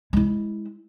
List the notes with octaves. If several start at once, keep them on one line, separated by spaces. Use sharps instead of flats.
G#3 E4